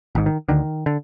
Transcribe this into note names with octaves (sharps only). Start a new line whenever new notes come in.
G#1 G#2
D#3
D2 D3 D#3
D3